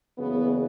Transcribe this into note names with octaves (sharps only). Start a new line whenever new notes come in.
F#1 E2 C#3 B3